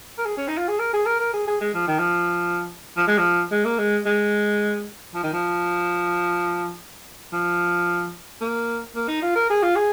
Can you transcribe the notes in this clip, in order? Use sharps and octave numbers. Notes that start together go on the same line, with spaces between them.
A#4
G#4
C#4
D#4
F4
G#4
A#4
G#4
A#4
A#4
G#4
G#4
G#3
F3
D#3
F3
F3
G#3
F3
G#3
A#3
G#3
G#3
F3
D#3
F3
F3
A#3
A#3
D#4
F4
A#4
G#4
F4
G#4